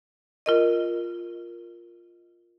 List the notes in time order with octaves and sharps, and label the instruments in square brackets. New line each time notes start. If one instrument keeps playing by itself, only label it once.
[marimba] F4 A#4 D#5